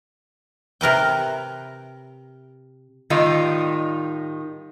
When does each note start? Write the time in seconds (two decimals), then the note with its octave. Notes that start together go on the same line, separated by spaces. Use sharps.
0.81 C3 A#4 B4 G5
3.10 A2 D#3 G3 D#4 F4